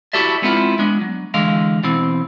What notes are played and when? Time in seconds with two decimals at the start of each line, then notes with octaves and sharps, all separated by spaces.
0.13 E4 F#4 G4 A4 D5 E5
0.42 G#3 B3 C4 E4 F4
0.79 G#3 B3 D4
1.01 F#3
1.34 D3 E3 G#3 D#5 F5
1.83 B2 E3 C4